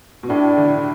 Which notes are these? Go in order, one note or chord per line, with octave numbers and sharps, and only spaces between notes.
B2
A2 D4
D3